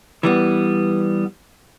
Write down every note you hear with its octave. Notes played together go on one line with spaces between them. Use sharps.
E3 G3 B3